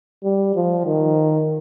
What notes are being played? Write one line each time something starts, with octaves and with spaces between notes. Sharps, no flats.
G3
F3
D#3